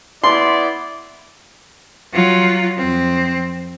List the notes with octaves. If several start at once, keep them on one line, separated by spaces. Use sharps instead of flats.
B3 E4 D5 C6
F#3 F4
F2 C4